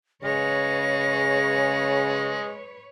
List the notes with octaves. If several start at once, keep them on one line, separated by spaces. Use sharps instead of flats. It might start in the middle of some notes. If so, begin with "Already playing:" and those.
C#3 G#3 B4 C#5 A#6